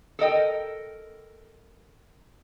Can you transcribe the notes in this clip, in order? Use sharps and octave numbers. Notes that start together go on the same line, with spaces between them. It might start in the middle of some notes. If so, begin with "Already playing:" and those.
A4 A#4 D#5 G5